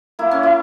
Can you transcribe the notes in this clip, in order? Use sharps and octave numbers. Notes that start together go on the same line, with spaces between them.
A#3 E4
C#4
E4